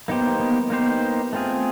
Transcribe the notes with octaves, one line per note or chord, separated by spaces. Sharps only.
A#3 B3 D#4 G4 C5
B3
A#3 B3 D#4 G4 C5
A3 C4 F4 G#4